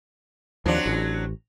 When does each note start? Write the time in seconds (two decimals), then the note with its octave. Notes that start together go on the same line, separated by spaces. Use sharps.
0.66 D#2 F3 F#3 C4 D4
0.86 A1